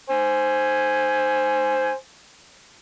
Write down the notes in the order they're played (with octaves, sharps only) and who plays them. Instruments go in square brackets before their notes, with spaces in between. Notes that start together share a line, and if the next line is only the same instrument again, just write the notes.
[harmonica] C5 G#5